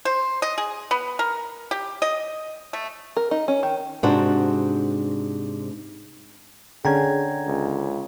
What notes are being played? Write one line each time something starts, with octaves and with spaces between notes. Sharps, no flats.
C5
D#5
G#4
B3
A#4
G4
D#5
A3
A#4
D#4
C#4
D#3
G#2 C3 D4 F#4
D3 C#4 G#4 G5 A#5 G#6
C#2